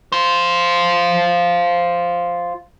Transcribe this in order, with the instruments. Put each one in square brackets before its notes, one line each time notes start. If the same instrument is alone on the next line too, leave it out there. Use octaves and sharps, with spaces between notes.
[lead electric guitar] F4 C5